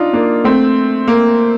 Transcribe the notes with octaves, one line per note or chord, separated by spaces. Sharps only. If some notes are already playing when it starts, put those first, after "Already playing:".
Already playing: D4 D#4 F4
A#3 D4
A3 C4
A#3